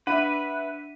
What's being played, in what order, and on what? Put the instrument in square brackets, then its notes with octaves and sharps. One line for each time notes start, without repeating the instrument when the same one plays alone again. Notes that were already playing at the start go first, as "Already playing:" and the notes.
[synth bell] D4 B6 D#7 [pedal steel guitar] B4 [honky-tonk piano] E5 F#5